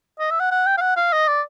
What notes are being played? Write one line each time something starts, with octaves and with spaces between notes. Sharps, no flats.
D#5
E5
F#5
F#5
G5
F5
F#5
F5
D#5
D5